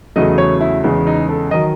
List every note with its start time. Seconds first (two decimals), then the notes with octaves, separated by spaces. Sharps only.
0.16 E2 C#3 F#3 A3 D#5
0.38 C#5
0.61 E4
0.84 E2 C#3 G#3
1.07 D#4
1.29 A4
1.51 D#3 F#3 D#5